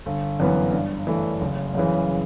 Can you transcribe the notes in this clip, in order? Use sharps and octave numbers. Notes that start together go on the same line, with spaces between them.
G1
F#2 E3 B3
G2
E3 A3
F#1
F#2 C#3 E3